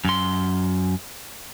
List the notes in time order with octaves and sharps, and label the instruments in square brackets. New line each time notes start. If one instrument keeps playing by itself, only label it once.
[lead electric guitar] F#2 C6